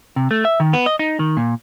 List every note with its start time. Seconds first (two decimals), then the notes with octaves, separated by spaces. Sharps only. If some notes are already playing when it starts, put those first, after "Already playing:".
0.16 C3
0.31 A3
0.45 E5
0.60 D#3
0.73 B3
0.86 D#5
0.99 D#4
1.19 D#3
1.37 A#2